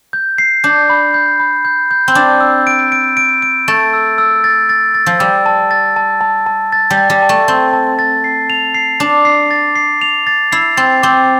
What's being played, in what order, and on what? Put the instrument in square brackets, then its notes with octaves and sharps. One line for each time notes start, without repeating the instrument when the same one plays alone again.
[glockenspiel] G6
C7
[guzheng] D4 [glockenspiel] G6
[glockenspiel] B5
G6
B5
G6
G6
[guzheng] C4
[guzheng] D4 [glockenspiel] A6
[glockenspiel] E6
D7
D7
D7
D7
[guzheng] A3 [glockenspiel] A6
[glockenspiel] E6
E6
A6
A6
A6
[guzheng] F3
[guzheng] G3 [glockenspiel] E6
[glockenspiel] A5
A6
A5
A5
A5
A6
[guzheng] G3
[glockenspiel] A6
[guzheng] G3
[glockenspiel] A5
[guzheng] A3
[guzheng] C4 [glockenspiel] A5
[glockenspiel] A5
A6
C7
F7
C7
[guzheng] D4 [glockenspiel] D6
[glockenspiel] C7
A6
C7
F7
A6
[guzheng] E4 [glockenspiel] C7
[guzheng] C4 [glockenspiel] A6
[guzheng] C4 [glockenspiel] D6